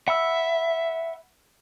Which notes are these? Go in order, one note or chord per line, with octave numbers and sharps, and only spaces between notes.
E5 F#5 B5 E6